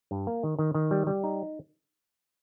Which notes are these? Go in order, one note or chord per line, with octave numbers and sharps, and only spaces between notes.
G2
A#3
D#3
D#3
D#3
G3
G3
D#4